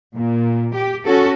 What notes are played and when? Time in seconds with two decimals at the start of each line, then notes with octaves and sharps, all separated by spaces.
0.15 A#2
0.73 G4
1.05 C#4 F#4 A4